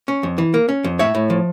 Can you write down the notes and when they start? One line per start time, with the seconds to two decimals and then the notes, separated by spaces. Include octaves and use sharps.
0.08 C#4
0.23 F2
0.38 E3
0.54 A#3
0.69 C#4
0.84 F2
0.99 A2 C#5 E5
1.15 A2
1.30 F3